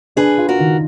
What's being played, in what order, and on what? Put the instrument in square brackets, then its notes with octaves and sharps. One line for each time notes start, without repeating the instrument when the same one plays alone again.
[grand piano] D4 [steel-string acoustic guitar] G#4 B4
[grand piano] F4
[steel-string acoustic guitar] F#4 A#4
[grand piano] D#3